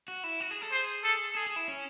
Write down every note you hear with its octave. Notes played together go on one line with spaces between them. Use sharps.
F#4
E4
F#4
G#4
A4
G#4 C5
A4
G#4 A4
G#4
E4
C#4